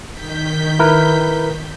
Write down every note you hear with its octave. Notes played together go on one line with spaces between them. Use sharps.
D#3 G6 B6
E4 A#4 B4